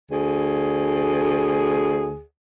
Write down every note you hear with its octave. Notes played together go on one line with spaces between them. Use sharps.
D2 G#4